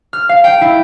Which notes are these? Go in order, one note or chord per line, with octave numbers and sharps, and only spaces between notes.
F6
F5
G5
E4